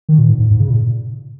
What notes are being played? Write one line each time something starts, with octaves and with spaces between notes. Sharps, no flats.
D#3
A#2
G#2
G#2
G#2
C#3
A#2